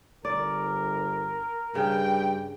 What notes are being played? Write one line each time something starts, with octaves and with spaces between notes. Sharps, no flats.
G1 A#4 D5
G2 C#3 G5